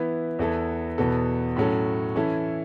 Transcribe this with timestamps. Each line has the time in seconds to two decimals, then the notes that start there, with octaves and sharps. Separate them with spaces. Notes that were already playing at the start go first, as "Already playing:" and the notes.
Already playing: E3 B3 E4 B4
0.39 E2 E3 B3 E4 A4
0.98 E2 B2 B3 A4
1.56 A2 F#3 C#4 A4
2.16 E3 C#4 E4 A4